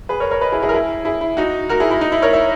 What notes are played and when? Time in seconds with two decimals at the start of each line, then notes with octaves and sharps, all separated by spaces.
0.09 G#4 B4
0.20 A#4 C#5
0.31 A#4 C#5
0.41 B4 D#5
0.52 E4 G#4
0.62 E4 G#4
0.69 A#4
0.73 E4 G#4
1.05 E4 G#4
1.21 E4
1.37 D#4 F#4
1.69 F#4 A#4
1.80 E4 G#4
1.91 E4
2.01 D#4
2.12 E4
2.22 A#4 C#5
2.33 C#5 E5